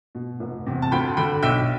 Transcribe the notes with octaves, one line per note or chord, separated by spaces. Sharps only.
B2
F1
E2 C3
A5
D2 G5 B5
D3 G5 B5
B1 E5 G5